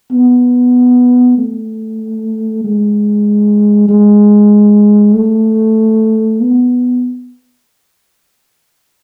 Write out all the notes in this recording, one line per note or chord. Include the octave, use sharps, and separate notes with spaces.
B3
A3
G#3
G#3
A3
B3